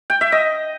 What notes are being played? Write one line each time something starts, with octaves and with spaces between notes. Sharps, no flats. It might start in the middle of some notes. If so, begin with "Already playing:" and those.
G5
E5
D#5